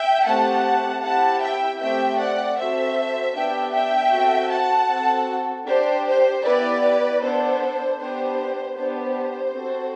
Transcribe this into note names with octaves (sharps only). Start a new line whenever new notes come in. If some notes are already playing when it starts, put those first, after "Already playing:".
Already playing: E5 G5
A3 C4 G4 F#5 A5
C4 E4 G4 F#5 A5
E5 G5
A3 C4 G4 E5 G5
D5 F#5
C4 F#4 A4 C5 E5
B3 D4 G4 E5 G5
E5 G5
C4 F#4 A4
F#5 A5
C4 F#4 A4
D4 G4 C5
C5
B3 E4 G4 B4 D5
B3 D4 A4 C5
B3 D4 G4 C5
B3 D4 G4 C5
C4 F#4 A4